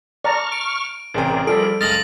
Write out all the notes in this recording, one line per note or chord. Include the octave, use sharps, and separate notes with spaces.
D5 A5 A#5 C#6 F6
D7
A1 C3 G#4 A#4 D5 G5
F3 G3 A4 D7
F#1 G#3 D#6 F6 A6 A#6 F#7